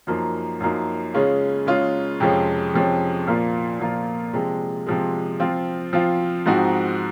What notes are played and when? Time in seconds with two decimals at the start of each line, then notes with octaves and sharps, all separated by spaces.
0.07 F#2 F3 A#3 D#4
0.60 F#2 F3 A#3 D#4
1.14 C#3 G#3 C#4 F4
1.67 C#3 G#3 C#4 F4
2.20 F2 C3 F3 G#3 C#4
2.74 F2 C3 F3 G#3 C#4
3.27 A#2 F3 A#3 F4
3.80 A#2 F3 A#3 F4
4.33 C3 F3 G#3
4.86 C3 F3 G#3
5.40 F3 C4 F4
5.93 F3 C4 F4
6.46 G#2 F3 C4 D#4 F#4